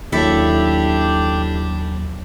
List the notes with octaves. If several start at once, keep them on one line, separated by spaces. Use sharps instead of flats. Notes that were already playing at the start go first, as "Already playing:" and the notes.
D#2 F#3 D4 E4 G4 A4 E5